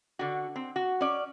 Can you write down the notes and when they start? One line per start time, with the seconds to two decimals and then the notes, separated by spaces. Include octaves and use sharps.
0.19 D3 F#4
0.56 C4
0.76 F#4
1.01 C#4 D5